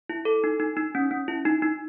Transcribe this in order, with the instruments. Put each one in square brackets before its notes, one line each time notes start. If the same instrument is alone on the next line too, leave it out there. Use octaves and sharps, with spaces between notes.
[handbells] E4
A4
D#4
D#4
D#4
C#4
C#4
E4
D#4
D#4